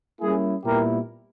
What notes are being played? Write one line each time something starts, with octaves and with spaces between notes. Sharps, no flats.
G3 A#3 C#4 E4 G#4
A#2 G3 B3 E4 G4 A#4